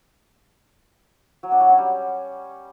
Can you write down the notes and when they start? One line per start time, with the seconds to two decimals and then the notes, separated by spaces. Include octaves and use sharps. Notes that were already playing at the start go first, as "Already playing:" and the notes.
1.43 F#3
1.52 D4
1.61 F#3
1.69 C#4
1.78 G3